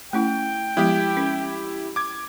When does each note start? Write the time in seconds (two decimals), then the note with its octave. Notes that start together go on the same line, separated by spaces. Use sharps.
0.13 A3 C#4 E4 G5
0.77 F3 G#3 B3 E4 G4
1.17 C#4
1.96 D6 G#6